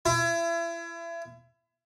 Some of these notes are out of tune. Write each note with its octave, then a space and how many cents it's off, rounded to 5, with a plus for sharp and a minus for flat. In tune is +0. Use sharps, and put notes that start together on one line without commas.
E4 +35